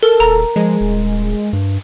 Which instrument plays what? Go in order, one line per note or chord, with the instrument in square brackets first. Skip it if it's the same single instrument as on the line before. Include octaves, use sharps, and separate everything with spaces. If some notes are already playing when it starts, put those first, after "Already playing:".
[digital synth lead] A4 [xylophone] A#4
[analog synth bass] D#1 [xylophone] A#5
[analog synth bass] F3 [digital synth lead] G#3
[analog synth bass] D#1
G2